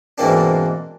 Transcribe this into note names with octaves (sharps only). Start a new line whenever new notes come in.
G#2 B2 E3 A#3 C4 D4